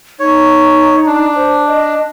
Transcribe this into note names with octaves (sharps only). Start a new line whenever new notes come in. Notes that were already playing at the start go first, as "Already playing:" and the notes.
D#4 C#5
D4
C5
D#5